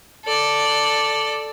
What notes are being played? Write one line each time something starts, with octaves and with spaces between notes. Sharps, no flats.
A4 D5